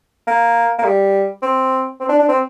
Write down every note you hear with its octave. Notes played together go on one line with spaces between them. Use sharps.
A#3
A#3
G3
C4
C4
D4
D4
C4